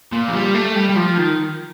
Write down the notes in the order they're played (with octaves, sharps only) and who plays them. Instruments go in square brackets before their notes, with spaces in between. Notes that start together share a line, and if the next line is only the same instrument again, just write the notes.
[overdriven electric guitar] A#2
F3
G3
A3
G3
G3
F3
D#3